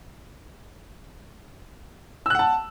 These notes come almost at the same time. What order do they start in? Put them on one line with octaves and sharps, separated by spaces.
E6 F#6 F#5 A5